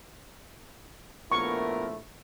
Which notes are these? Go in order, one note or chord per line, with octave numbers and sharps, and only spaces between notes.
A#1 A3 B3 E4 F4 A#4 C#6